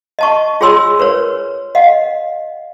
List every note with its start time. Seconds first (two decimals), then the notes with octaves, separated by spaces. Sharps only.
0.19 D#5 A5 C#6
0.61 F4 G#4 C#5 G#5 C6 E6
1.00 A#4 B4 C#5
1.75 D#5 F5 F#5